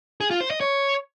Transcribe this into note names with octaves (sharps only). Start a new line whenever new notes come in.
G#4
F4
C5
D#5
C#5